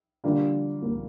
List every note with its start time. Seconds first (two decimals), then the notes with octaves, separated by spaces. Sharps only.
0.24 D3 G3 A#3 D4 F4
0.82 A#3